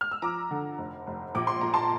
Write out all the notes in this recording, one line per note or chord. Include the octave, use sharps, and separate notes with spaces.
F6
E6
F3 A#5 D6
D3
F1
F1
A#1 D6
C6
A#2 A#5
A5 C6